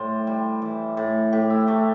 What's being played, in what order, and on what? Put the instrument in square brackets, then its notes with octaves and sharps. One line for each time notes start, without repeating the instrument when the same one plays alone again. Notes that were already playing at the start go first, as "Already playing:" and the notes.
Already playing: [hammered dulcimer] A2 G3 C5 D5
G3
E3
A2
A2 G4
E4
A3 G4